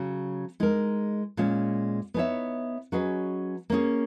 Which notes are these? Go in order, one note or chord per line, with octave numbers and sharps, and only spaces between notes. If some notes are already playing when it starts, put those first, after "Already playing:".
Already playing: C#3 F#3 C#4
G#3 D#4 A#4
A#2 G#3 C#4
B3 D#4 G#4 C#5 E5
F#3 C#4 G#4 B4 D#5
A#3 C#4 G#4